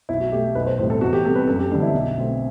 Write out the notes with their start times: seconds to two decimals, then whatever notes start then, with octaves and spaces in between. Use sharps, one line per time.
0.09 B1 E4
0.20 F#4
0.32 B2 A3 G4
0.55 B1 B4
0.66 C5
0.78 A2 G3 C4 C5
0.90 A4
1.01 E2 F#4
1.13 G4
1.25 C3 G3 B3 A4
1.35 B4
1.48 F#2 A4
1.59 G4
1.70 D3 G3 B3 D4
1.82 E4
1.94 B1
2.17 B2 A3 C4